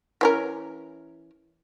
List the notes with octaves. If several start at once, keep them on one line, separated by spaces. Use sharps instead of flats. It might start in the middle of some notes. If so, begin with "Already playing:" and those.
E3 C#4 A#4